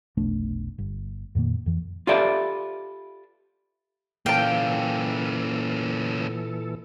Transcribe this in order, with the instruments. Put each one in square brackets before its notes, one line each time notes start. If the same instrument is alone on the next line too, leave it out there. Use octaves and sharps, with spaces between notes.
[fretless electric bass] F1 B1 A3 D4
G1
F2 A#2 D#3 A#3
F2 E3
[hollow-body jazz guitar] F4 G4 A4 B4 D5 E5
[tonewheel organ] A#2 E3 A4 [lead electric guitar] A#3 C#4 [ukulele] F5 A5 [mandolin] G5